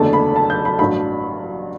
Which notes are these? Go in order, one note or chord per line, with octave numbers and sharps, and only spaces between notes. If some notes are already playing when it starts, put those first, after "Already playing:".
Already playing: F#1 E2 D3 A3 A5
B5
A5
G6
B5
A1 G2 F#3 B5